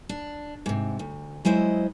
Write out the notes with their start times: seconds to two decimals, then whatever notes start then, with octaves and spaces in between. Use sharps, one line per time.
0.09 D4
0.66 G#2 C3
0.99 D2
1.45 F#3 G#3 E4 C5 D#5